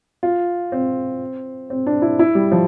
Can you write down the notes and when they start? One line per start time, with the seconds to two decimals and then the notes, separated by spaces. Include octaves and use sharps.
0.23 F4
0.72 C4
1.70 C4
1.87 D4
2.02 E4
2.19 E4
2.35 G3
2.52 F3